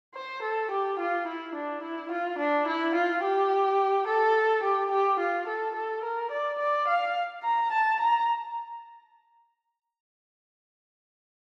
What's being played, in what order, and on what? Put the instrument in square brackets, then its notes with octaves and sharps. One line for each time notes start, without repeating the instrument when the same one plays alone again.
[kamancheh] C5
A4
G4
F4
E4
D4
E4
F4
D4
E4
F4
G4
A4
G4
G4
F4
A4
A4
A#4
D5
D5
F5
A#5
A5
A#5